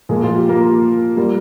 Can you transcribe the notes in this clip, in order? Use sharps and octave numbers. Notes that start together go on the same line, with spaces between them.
A#2 F3 G#3 A#3 G#4
F4
G4
A#3 A#4
G3 A#3